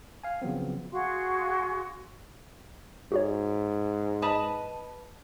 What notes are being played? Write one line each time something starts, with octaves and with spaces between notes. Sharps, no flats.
F5 G#5
C#3 F3 F#3 B3 C4
F#4 G#4 F5 C6
G#2 F#4 G4 C#5
B4 D#5 A5